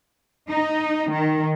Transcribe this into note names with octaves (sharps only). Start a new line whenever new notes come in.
D#4
D#3